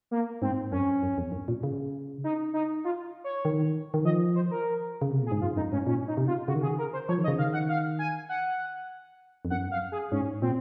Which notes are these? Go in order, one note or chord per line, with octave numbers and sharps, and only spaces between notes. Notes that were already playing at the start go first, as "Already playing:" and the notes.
A#3
G#2 C4
F#2 C#4
F#2
F2
F#2
A#2
C#3
D#4
D#4
F4
C#5
D#3
D#3
F3 D#5
C5
A#4
C#3
C3
A#2 G#4
G#2
F#2 F4
F#2 D#4
G#2 C#4
A#2 C#4
D#4
C3
F4
C#3 F#4
D#3
C#3 G#4
A#4
C5
F3 C#5
D#3
D#5
C#3
D#3 F5
F#5
F5
G#5
F#5
F2
F#2 F#5
F5
G#4
G#2 C#4
A#2 C4